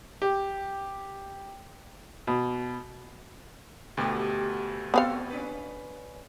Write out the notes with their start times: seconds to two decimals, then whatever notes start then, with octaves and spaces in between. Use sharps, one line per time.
0.22 G4
2.27 B2
3.97 D2 B2 A3 G4
4.94 B3 C4 F#4 A4 F5
5.30 C#4 D4 B4